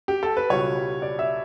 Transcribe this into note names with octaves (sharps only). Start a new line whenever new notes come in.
G4
A4
B4
C#2 B2 G3 C#5
D5
E5